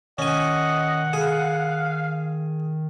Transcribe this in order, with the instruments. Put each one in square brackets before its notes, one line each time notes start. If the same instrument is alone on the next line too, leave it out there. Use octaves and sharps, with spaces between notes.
[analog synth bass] D#3 [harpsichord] C#4 G#5 [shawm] D#5 [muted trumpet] F#5
[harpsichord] G#4 [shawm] F5